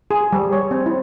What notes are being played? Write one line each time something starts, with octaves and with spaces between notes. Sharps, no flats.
G#4
G3
C#5
C4
E4